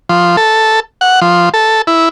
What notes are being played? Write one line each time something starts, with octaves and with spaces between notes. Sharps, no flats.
F3
A4
F#5
F3
A4
E4